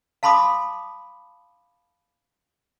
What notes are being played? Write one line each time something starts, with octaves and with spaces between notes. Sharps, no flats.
F5 A5 B5 C6 D6 D#6